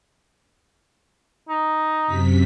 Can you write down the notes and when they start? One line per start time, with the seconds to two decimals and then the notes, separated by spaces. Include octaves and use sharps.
1.49 D#4
2.06 F#2 C3 B6